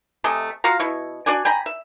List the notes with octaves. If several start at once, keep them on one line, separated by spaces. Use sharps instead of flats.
C3 A3 D#5 G#5
F4 F#4 F5 A#5
B2 E4 C#6
D4 F#4 D5 G#5
G5 G#5 A#5 B5
E5